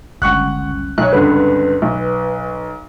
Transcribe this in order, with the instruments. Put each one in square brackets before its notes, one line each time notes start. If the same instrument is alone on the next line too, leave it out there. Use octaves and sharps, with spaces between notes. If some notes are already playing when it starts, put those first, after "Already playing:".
[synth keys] G1 C#2 [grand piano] F#5 C#6 F#6
[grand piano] B1 C#5 [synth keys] F#6
[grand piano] C#2 G2 D3 [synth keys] B4
[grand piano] B1